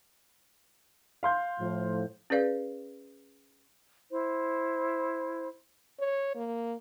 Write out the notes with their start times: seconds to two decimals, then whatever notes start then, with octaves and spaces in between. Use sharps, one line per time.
1.23 F5 C6 G6
1.60 A2 F3
2.30 C#4 G#4 B4 D5 F5
4.11 E4 C5
6.00 C#5
6.35 A#3